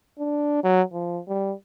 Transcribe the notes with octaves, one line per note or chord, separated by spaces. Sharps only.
D4
F#3
F3
G3